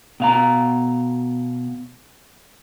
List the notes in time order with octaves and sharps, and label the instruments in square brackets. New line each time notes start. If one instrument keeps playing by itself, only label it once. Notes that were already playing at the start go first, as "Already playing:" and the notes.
[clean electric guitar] B2 F5 A#5